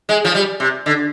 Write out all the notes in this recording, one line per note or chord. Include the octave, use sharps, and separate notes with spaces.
G#3
F3
G3
C3
D3